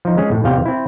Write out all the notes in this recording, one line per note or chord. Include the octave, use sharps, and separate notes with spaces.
F3 D#4
G#3 C#4 G#4
A2
E2 C3 F5 G5
C4 E4